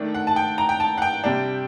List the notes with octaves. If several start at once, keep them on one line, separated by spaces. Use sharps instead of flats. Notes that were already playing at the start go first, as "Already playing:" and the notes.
Already playing: D#3 A3 D4
F#5
A5
G5
A#5
G5
A5
F#5
G5
C3 G3 D4